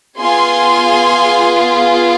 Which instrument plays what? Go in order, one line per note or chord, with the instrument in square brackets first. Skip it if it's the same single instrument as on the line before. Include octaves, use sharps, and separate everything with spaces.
[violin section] B3 F4 G#4 G#5 C6